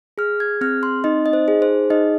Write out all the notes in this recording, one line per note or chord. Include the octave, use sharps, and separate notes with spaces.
G#4 F6
G#6
C4 F6
C6
D#4 D#5
D#5
C5
G#4
C5
D#4 D#5